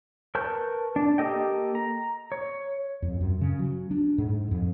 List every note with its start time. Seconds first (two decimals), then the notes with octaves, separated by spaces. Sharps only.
0.35 A#4 B4 A5 C#6 G6
0.96 D4
1.18 A#3 G4 A4 D#5 G5
1.75 A#5
2.32 C#5
3.02 F2
3.21 F#2
3.41 C#3
3.59 F#3
3.91 D4
4.18 G#2
4.51 F2